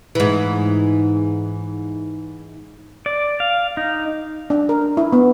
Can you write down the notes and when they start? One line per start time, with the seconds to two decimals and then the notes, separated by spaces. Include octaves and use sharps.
0.15 G#2 E3
3.06 D5
3.40 F5
3.77 D#4
4.50 D4
4.69 A#4
4.97 E4
5.13 B3